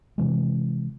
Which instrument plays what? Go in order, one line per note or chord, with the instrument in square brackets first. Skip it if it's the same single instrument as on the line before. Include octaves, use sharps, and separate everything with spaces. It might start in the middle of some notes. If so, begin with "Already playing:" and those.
[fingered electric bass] C3 E3 G#3